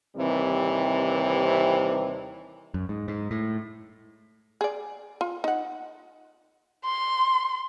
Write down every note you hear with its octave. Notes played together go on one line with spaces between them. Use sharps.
D#2 C3 E3 G3 C4
F#2
G#2
G#2
A2
G#4 D5
F4
D#4 F#5
C6